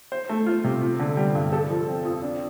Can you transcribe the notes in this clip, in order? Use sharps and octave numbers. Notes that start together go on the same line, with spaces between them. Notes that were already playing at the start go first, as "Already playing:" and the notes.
C5
A3
F4
C3
F4
D3
G3
G2
A4
F3
C4
F2
D4